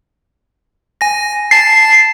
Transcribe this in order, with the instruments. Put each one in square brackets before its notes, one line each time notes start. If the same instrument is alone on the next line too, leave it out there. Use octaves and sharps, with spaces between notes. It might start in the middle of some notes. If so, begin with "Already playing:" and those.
[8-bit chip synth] G#5 A#6
[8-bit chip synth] A5 A6 [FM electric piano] C7